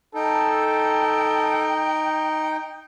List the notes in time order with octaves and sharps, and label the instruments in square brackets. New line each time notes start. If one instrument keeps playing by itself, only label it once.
[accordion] D#4 [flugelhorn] A4 [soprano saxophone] G5